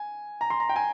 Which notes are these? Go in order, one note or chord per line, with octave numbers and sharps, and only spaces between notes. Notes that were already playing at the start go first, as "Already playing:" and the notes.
Already playing: G#5
A#5
C6
A#5
G5
G#5